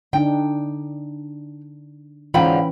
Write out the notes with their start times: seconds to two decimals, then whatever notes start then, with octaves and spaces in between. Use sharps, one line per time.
0.13 D3 D4 D#4 G5
2.34 G#2 D3 E3 C#4 F4 G5 B5